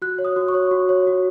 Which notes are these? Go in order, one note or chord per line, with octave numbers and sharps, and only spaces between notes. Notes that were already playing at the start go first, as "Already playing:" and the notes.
F#4 F#6
C#5
D#6
F#4
C#6
C#5
F#4
C#5
F#4